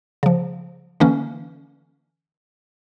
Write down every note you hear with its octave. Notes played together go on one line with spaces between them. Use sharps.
C#3 F3
D3 E3 A#3 C#4